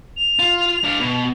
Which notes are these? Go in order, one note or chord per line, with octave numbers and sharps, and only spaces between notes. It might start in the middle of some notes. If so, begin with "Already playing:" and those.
F7
F4
D4 F5
B2